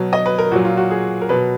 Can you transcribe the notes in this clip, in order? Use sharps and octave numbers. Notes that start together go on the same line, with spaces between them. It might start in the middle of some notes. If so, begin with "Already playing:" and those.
Already playing: B2 F#3
D#5
B4
A#4
A#2 F#3 F#4
F4
F#4
G#4
A#4
B2 F#3 B4